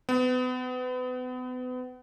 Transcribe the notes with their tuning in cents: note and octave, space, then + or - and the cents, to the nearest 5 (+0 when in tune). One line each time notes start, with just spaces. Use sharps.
B3 +35